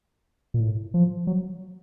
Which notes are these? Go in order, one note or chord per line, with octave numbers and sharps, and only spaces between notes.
A#2
A2
F3
F#3